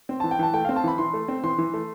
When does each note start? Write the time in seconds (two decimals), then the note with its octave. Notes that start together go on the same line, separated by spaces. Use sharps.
0.09 C4
0.20 E3 A5
0.31 G5
0.39 E3 A5
0.54 A3 G5
0.65 C4 F5
0.76 A5
0.84 E3 B5
0.98 E3 C6
1.14 A3
1.28 C4
1.43 E3 C6
1.58 E3
1.74 A3